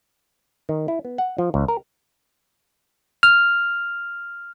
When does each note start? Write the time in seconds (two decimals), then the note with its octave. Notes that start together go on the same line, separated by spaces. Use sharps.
0.69 D#3
0.88 E4
1.05 B3
1.18 F#5
1.38 F3
1.54 C#2
1.68 A#4
3.23 F6